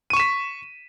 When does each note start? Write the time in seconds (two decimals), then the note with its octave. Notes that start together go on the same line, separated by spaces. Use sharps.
0.10 D#7
0.13 C#6
0.17 E7
0.20 B6